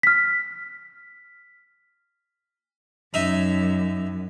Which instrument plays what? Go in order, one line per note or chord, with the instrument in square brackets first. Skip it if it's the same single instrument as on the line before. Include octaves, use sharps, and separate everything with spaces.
[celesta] F6 B6
[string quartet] F#2 [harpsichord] D#4 E5